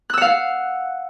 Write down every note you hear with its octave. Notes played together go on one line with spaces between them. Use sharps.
F5 F#5 E6 F#6